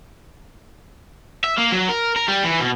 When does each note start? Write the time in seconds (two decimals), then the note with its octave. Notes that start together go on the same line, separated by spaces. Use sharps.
1.44 E5
1.58 A#3
1.72 F#3
1.89 A#4
2.16 A#4
2.28 G3
2.44 E3
2.60 B2